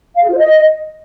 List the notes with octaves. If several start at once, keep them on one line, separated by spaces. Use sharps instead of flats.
F5
G#4
F4
C5
D#5